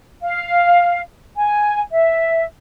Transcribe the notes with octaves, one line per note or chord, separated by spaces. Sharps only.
F5
G#5
E5